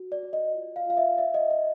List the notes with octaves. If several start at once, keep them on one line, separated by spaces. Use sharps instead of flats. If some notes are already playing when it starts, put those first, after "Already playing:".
Already playing: F#4
D5
F#4
D#5
F4
F5
F4 F5
E5
D5 E5
D#5
D5 D#5